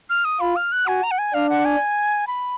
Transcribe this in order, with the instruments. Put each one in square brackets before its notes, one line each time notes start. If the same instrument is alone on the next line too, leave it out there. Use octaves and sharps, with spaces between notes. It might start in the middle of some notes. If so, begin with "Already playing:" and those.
[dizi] F6
D#6
[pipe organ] F4 [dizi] B5
[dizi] F6
F#6
[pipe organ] F#4 [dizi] G#5
[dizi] A#5
F#5
G#5
[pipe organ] D4 [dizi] F5
[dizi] F#5
G#5
B5